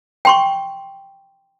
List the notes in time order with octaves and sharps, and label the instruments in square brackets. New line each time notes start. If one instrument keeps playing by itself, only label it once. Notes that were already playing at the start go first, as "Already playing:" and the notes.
[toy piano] G5 C6 C#6